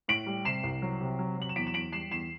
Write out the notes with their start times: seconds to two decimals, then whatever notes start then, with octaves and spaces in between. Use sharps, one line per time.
0.08 A2 D7 F#7
0.26 G3
0.44 C3 C7 E7
0.63 C2
0.82 F#3
1.00 C3
1.19 F#3
1.38 F#3 F#7
1.49 E7
1.56 E2 B6 D7
1.67 E7
1.74 E2 D7 F#7
1.92 G3 C7 E7
2.11 E2 C7 E7